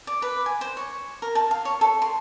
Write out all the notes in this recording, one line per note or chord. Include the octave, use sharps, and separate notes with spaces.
D5
B4
G#5
C5
C#5
A#4
A5
F5
C#5
A4
C6